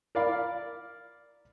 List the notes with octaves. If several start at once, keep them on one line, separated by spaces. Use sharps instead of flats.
A#4 D5 F5 B5